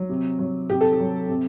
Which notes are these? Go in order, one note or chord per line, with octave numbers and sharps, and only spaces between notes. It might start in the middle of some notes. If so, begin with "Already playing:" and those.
Already playing: F#3
C3
F#3
C3 G4
A4
G4
F#3
C3